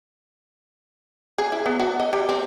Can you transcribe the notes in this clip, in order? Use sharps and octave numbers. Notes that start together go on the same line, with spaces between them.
G#4
E4
B3
F#4
D#5
G3
C4